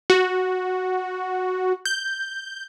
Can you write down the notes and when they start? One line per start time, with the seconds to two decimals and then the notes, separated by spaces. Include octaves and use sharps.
0.10 F#4
1.85 G6